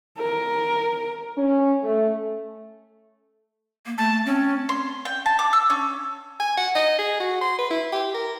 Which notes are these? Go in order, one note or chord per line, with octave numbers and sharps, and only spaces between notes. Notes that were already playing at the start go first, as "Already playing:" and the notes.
A#4
C#4
A3
A#3
A3 A5
C4 C#4
C6
G5
A5
D6
E6
C#4
G#5
F#5
D#5
G#4
F#4
C6
B4
E4
G4
A#4